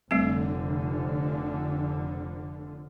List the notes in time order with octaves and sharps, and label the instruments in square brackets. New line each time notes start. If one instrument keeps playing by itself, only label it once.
[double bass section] F1 D3 F3 [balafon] G3 A3 C4